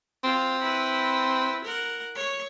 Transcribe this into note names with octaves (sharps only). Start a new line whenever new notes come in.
C4 F4 F5
E4 B4
A#4 F#5
C#5 C#6